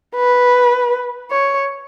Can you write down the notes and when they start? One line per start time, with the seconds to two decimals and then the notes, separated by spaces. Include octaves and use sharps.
0.15 B4
1.31 C#5